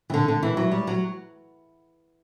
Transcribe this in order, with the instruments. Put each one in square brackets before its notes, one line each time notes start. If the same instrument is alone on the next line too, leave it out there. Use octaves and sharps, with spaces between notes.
[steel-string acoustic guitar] E3
D3
D3
E3
F#3
G3
F#3